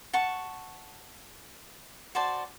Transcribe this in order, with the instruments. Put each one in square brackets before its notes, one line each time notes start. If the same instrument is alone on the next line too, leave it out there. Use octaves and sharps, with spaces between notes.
[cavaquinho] F#5 A5 C#6
F#4 C5 D5 A5